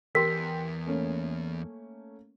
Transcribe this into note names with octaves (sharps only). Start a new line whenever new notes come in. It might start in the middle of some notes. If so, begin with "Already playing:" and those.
E2 G4 A#4 G5 C6 B6
A3 A#3 C#4